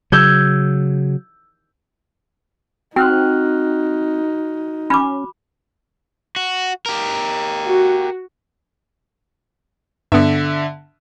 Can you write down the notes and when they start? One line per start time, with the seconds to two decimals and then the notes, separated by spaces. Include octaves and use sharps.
0.12 C#3 F#3 E6 G6 G#6
2.96 C4 D#4 F#4 G5 F6 F#6
4.90 C#4 B5 D6
6.36 F#4
6.86 G4 A#4
7.66 F#4
10.12 G2 D3 B3 E5